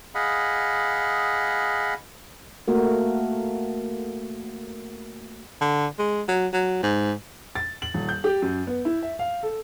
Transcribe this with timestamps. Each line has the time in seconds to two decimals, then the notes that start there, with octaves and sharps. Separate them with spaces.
0.15 G#4 D#5 F5 F#5 B5
2.68 A3 A#3 F#4 A#4
5.61 D3
5.99 G#3
6.28 F#3
6.53 F#3
6.83 G#2
7.55 A6
7.82 F#7
7.94 D#1
8.09 G6
8.24 G4
8.42 F#2
8.67 B3
8.85 E4
9.02 E5
9.19 F5
9.43 A4